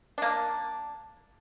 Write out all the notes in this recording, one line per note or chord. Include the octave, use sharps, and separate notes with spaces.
A#3 D4